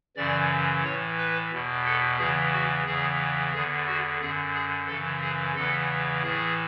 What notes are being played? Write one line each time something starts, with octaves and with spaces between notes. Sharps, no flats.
F#2 C#3 E3 D5
A2 E3 C#5
B4
E2 B2
A4
E2 C#3 E3 G#4
F#4
E2 C#3 E3 G#4
E2 D3 G#4
F#4
F#2 D3 G#4
G#4
F#2 C#3 E3 A4
G#4
E2 C#3 E3 A4
A2 E3 G#4